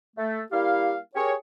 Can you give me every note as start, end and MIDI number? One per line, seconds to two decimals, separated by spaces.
0.16 0.41 57
0.52 0.97 55
0.52 0.97 58
0.52 0.97 64
0.52 0.97 67
0.52 0.97 77
1.15 1.32 67
1.15 1.32 68
1.15 1.32 70
1.15 1.32 73